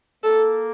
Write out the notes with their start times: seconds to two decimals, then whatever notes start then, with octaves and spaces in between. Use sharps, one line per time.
0.24 A#3 A4